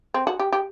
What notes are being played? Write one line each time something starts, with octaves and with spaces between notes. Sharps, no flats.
C4
F#4
G4
G4